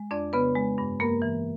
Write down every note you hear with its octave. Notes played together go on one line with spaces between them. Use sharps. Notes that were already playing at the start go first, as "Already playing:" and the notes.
Already playing: G#3
F2 D4 D5
C#3 B3 B4
G#3
G2
G2 A#3 A#4
E3